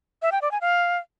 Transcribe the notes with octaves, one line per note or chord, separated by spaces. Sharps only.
E5
G5
D5
G#5
F5